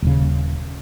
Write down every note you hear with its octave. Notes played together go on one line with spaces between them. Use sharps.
D#1 C#3